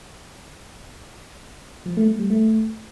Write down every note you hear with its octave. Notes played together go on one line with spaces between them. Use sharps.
F3
A3
A3
G3
A3